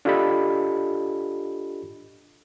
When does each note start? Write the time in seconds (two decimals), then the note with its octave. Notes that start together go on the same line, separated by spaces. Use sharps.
0.05 D4 F4 G4 A4 D#5 B5